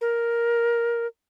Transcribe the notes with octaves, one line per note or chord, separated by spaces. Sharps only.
A#4